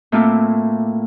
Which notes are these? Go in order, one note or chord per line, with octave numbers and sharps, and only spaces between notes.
A2 A3 A#3 C4 F4 D6